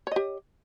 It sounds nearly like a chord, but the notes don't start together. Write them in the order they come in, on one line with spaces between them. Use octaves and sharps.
C#5 D#5 G4